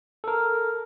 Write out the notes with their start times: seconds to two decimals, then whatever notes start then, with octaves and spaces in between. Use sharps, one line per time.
0.24 A4 A#4